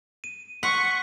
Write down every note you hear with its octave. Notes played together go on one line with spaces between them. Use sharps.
D#7
F#5 C6 C#6 F#6 B6